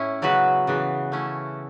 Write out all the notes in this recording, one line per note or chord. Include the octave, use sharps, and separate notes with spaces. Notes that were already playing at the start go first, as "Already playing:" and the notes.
Already playing: A2 C#4 E4
C#3 F#3 B3 F#4 B4
C#3 E3 B3
A3 C#4 E4